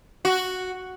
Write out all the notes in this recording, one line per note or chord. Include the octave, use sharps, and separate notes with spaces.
F#4